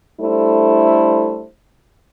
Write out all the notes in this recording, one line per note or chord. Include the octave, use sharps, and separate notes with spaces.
G3 A3 D4 E4 A4 C5